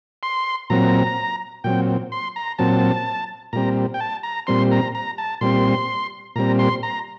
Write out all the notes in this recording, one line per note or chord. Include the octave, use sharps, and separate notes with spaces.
C6
A#2 F#3 C4 A#5
A#2 F#3 C4 G5
C6
A#5
A#2 F#3 C4 A5
A#2 G3 C4 A#5
G5
A5
A#5
A#2 G3 C4 C6
A#5
A#5
A5
A#2 G3 C4 C6
A#2 G3 C4 A#5
C6
A#5